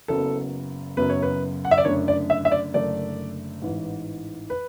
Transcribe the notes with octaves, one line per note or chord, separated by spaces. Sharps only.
F#1 F#2 C#3 F#3 B3 A4
F#1 F#2 C#3 F#3 B3 B4
C#5
B4
F#5
E5
D5
F#1 F#2 D3 A3 D4 C#5
D5
E5
E5
D5
F#1 F#2 D3 A3 D4 D5
A1 G#2 E3
B4